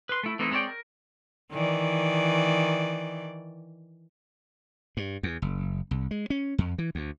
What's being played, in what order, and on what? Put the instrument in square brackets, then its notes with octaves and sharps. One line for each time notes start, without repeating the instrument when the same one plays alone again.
[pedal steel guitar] B4 C6
A3 E4
E3 A3 C4 D#4 E4
G#3 C4 C#5 D5 G5
A#4
[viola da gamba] D#3 E3 D5
[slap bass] G2
E2
F#1
C2
G#3
C#4
F2
E3
D2